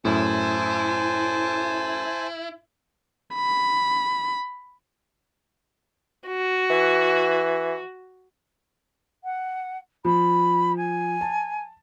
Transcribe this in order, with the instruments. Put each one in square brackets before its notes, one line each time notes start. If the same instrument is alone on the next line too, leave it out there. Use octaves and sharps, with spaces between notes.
[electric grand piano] F#2 A2 [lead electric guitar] E4 [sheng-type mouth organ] C5 G#5 A5
[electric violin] B5
[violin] F#4
[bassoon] E3
[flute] F#5
[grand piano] F3 [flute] B5
[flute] G#5
[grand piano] A5